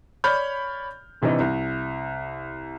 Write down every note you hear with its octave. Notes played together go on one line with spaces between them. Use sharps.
C#5 D5 B5 F6 G6
G2 C3 E3 G3 D#4
C2